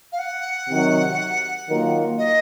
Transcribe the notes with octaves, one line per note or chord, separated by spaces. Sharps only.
F5
F#5
C3 D#3 F#3
D#3 F#3 A#3 F4 A#4
D#5